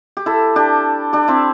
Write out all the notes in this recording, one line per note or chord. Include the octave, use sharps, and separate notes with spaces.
G4
E4 A4
D4 G4
D4 G4
C4 E4